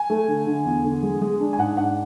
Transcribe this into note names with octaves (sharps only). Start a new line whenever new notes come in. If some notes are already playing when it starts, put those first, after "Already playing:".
Already playing: G#5
A3
D3
D3
E2
D3
G#3
G#3
D4
G#5
G#2 F#5
D4 F#5